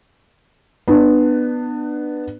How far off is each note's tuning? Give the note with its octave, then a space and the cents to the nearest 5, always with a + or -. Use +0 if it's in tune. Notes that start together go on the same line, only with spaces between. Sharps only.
B3 +0 D4 +30